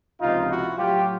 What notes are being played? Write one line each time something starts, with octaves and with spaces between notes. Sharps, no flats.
C#2 C3 F3 D#4 F4
E4 F#4
A2 F#3 F4 G4